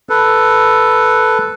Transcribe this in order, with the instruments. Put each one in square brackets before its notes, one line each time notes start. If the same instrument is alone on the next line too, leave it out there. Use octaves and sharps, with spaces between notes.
[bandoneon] A4 B4